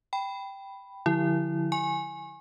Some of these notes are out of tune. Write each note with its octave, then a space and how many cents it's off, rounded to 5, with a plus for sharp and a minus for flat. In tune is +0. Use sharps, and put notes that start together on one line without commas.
G5 +0 B5 +0
D3 +0 F3 +30 E4 +0
G#5 +0 C#6 -40